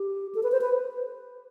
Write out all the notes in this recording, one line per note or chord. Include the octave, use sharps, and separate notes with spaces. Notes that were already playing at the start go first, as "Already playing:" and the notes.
Already playing: G4
A4
B4
C5
B4